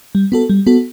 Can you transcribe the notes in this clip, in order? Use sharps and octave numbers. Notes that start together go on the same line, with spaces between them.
G3
B3 F#4 A4
G3
B3 F#4 A4